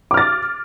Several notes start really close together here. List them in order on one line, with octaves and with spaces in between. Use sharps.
D6 F6 A6